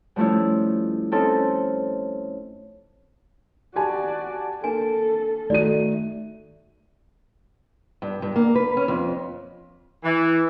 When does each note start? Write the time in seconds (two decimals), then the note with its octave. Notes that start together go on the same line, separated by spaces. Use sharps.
0.16 G2 F3 A3 C#4 E4
1.12 C4 C#4 D#4 A4
3.76 F#4 G4 D5 G#5 A5
4.64 A#3 D4 A4 G#5
5.50 D#3 A3 F#4 D5 D#7
8.02 G2
8.22 G2
8.36 A#3
8.55 B4
8.77 C#4
8.88 F2
10.04 E3